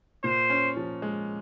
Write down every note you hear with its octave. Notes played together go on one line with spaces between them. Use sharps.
A#2 C5
C#4
F3
G#3